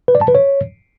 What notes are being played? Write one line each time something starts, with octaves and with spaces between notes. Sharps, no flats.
B4
D5
A5
B4
C#5